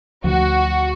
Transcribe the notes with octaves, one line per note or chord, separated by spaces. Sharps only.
D2 F3 F#4